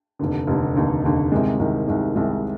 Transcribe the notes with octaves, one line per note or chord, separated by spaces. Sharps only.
F1 D#2 D3
F1 D#2 D3
F1 D#2 D3
F1 D#2 D3
C2 C3 D#3 G#3
C2 C3 D#3 G#3
C2 C3 D#3 G#3
C2 C3 D#3 G#3